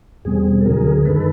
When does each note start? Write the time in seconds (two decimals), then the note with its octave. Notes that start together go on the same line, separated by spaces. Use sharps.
0.25 E2 B2 G3 C4 G#4
0.61 A4
0.66 D2 D3 F#3 G#4 A#4
1.05 F#2 D#3 G#3 A4 B4